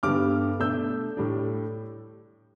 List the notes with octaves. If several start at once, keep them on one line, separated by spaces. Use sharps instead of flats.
G2 D3 G3 B3 D6 F6
B2 A3 D4 E6 G6
A2 G3 D4